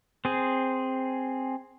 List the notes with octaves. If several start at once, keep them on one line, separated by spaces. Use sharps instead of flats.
C4 G#4